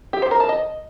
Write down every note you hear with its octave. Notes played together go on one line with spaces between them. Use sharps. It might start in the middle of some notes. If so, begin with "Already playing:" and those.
G4
C5
A#4
A5
D#5